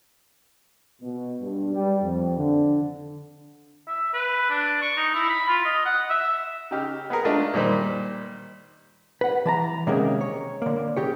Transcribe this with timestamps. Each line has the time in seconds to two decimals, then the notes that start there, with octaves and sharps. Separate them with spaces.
1.01 B2
1.40 G2
1.73 G3
2.01 F2
2.37 D3
3.88 E5
4.14 B4
4.50 D4
4.82 C#6
4.97 D#4
5.14 E4
5.29 B5
5.48 F4
5.65 D#5
5.85 F#5
6.10 E5
6.71 C#3 D#4 G4 F6
7.10 B3 G#4 A#4
7.24 G#3 A3 D4 D#4 F4
7.54 A#2 D#3 G3 C5
9.21 B4 F#5
9.45 E3 A5 A#5
9.87 C3 D#3 G#3 A#3 C#4
10.21 C#5
10.62 D3 A#3
10.97 C#3 G4 C#5